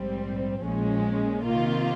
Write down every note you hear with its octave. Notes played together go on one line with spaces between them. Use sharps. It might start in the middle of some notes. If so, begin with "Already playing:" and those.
Already playing: A#1 G#2 G3 C4
A#1 A#2 F3 G#3 C#4
C3 D#3 A#3 F4